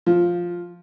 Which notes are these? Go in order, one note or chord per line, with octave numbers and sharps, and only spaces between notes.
F3